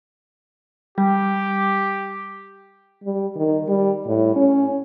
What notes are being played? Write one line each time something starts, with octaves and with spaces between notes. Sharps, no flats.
G3 G4
G3
D#3
G3
A2
C#4